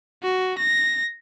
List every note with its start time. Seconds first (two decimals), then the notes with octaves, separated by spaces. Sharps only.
0.23 F#4
0.59 A#6